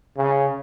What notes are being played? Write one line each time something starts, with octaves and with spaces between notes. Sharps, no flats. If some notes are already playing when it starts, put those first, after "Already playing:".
C#3